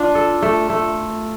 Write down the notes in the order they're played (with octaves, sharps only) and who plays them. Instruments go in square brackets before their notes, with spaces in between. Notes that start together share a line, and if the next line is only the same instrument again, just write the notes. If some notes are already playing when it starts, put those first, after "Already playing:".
Already playing: [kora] D4 [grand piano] F4
[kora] A4
A3
A3